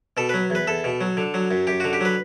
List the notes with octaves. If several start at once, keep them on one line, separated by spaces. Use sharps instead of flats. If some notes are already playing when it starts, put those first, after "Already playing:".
B2 A4
F#3 B4
E2 B4
E2 A4
B2
F#3
D3
F#3
F#2
F#2 G4
D3 F#4
G4
F#3 B4